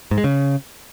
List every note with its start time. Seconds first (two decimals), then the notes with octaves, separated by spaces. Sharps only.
0.11 G#2
0.18 G#3
0.24 C#3